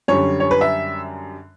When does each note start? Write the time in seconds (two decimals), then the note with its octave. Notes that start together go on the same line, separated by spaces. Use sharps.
0.08 F#2 D3 G3 C#5
0.40 C#5
0.51 B4
0.61 E5